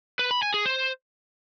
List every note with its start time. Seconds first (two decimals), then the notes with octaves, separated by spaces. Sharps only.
0.19 B4
0.31 B5
0.42 G#5
0.54 G#4
0.65 C5